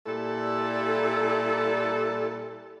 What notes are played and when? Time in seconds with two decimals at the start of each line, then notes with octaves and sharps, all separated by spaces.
0.06 A#2 G3 E4 A4